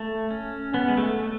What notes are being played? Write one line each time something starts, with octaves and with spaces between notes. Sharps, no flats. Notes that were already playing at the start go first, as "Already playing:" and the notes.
Already playing: A3
C#4
B3
G#3
A3
A3